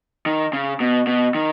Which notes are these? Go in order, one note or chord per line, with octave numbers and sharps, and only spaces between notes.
D#3
C#3
B2
B2
D#3